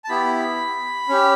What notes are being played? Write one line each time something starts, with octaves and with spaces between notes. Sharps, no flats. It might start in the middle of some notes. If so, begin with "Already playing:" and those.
A5
B3 E4 G4 B5
C#4 G4